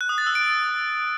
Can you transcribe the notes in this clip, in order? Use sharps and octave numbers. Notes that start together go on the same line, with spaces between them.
F#6
D#6
A6
E6
D7